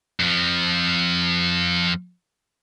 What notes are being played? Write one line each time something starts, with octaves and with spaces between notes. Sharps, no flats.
F2 F3